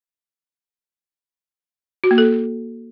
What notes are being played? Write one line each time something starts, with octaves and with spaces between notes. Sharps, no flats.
F#4
A#3
A4